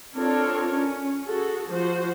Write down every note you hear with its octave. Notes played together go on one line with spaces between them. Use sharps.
C4 D4 F4 A4 A#4 C#5
C#4
F#4 G#4 A4
F3 F#4 C5